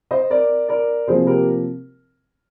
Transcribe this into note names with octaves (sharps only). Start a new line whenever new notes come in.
C5 D#5
A#4 D5
A#4 D5
C3 F3 A#3 G#4 C5
G4 A#4